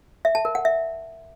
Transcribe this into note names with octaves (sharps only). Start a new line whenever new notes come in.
E5
A5
A#4
F#5
E5